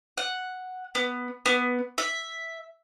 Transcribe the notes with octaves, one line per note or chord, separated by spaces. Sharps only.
F#5
B3
B3
E5